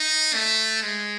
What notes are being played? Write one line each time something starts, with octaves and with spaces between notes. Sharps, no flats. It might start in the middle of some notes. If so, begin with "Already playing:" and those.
Already playing: D#4
A3
G#3